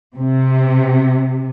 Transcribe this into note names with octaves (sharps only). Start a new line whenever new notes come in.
C3